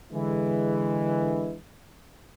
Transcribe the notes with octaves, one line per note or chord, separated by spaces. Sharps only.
D3 E3 G#3